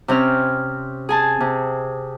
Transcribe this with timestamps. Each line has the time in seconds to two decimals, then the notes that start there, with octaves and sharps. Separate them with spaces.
0.08 C3 C4 C#4 F6
1.09 G#4 G#5 A5
1.40 C3